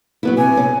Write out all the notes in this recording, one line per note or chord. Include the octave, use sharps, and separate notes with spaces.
F#3 B3 E4
C3 G#5
C#4